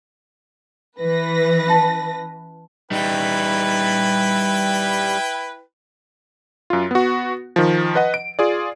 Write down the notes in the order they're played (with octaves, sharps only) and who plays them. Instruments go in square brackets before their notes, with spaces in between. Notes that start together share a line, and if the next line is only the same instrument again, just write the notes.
[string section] E3 B4 A#6
[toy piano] C#4 G5 A5
[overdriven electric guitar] G3 D#4 [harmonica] E4 B4 G5
[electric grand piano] F#2 F4
B3 F#4
D#3 F3
B4 D#5 F#5
D7
F4 G#4 D5